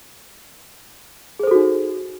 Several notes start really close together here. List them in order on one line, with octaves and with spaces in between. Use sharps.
G#4 C5 A4 F#4 D#4